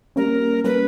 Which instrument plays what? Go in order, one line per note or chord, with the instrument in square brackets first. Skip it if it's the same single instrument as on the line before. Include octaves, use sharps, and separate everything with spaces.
[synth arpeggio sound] G3 A#3 C#4 [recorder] A#4
[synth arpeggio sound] G3 A#3 C#4 [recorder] B4